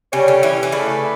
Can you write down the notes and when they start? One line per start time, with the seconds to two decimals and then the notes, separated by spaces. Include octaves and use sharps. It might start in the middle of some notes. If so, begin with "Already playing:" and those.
0.13 C#3 G3 C#4 G4 C#5
0.28 D3
0.43 E3
0.63 E3
0.72 C#3 A3 E4 B4 D5